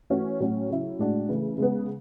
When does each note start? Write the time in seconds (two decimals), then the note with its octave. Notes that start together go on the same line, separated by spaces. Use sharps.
0.10 E3 A3 C#4 F#4
0.40 A2 F#3 C#4 F#4
0.69 C#3 F#3 C#4 E4
0.99 A2 G#3 D4 F#4
1.29 C#3 E3 A3
1.58 C#3 G#3 B3